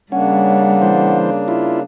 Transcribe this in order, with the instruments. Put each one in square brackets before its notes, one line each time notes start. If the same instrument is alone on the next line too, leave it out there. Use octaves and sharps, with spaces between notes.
[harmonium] C#3 A#3 D4 [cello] G3 [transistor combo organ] C#4 [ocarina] F#5
[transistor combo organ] E3 C5
E4 F4